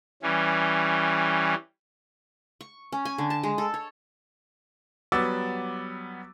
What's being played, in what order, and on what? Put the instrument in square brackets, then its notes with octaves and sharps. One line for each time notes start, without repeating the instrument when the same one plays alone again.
[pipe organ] E3 G3 C#4
[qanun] C#6
C#4
G#5
D3
A5
G#3
A4
C#5
[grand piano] F#3 G3 B3 D6 E6 A6